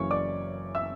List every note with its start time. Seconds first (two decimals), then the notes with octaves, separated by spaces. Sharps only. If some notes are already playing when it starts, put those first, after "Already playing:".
Already playing: F#1 F#2 C#3 E3 C#5 C#6
0.11 D5 D6
0.75 E5 E6